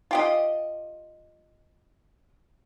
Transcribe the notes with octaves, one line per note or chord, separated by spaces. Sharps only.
F4 G4 D#5